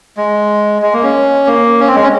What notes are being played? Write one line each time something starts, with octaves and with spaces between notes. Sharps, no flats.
G#3
G#3
A#3
C#4
A#3
C#4
C4
G#3
C#4